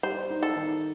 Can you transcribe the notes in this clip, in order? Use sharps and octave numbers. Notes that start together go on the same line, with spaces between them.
G3 C5
D#4
A4
D#3